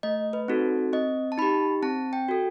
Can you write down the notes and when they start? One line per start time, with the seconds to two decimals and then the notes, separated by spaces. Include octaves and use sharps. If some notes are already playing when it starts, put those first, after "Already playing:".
0.03 A3 D#5
0.33 B4
0.48 C4 D#4 F#4 A4
0.93 C4 D#5
1.32 A5
1.38 D#4 G4 B5
1.82 C4 A5
2.13 G5
2.28 F#4 A4